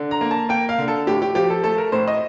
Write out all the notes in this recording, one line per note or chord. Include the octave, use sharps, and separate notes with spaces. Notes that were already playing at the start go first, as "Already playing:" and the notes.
Already playing: D3
A#5
A#3
A5
A#3 G5
F5
D3
A4
A2 G4
G4
F3 G4
A4
A3 A4
A#4
A2 C5
D#5